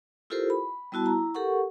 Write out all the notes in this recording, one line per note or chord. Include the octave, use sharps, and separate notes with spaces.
E4 F4 G4 A4 A#4 C5
B5
G3 B3 E4 F#4 A5
E4 A#5
G4 A4 A#4 F#5 C#6